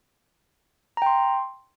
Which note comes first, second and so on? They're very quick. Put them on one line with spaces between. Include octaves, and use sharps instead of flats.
A#5 G5 C6